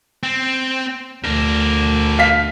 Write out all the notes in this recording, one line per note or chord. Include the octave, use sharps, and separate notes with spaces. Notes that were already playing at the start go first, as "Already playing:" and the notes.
C4
D2 D4 A#4
F5 B6